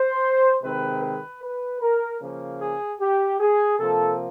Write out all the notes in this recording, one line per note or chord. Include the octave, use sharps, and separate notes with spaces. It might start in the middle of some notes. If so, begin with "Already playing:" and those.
Already playing: C5
C3 D#3 G#3 C4 B4
B4
B4
A#4
C#3 F3 A#3
G#4
G4
G#4
C3 F3 A#3 A4